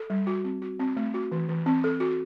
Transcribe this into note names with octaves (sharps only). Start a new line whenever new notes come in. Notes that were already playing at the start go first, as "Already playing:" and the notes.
Already playing: A4
G3
F#4
C4
F#4
C4
A3
F#4
E3
E3
C4
A4
F#4